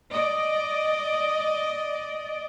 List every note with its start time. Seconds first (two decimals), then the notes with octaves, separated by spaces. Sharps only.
0.12 D5 D#5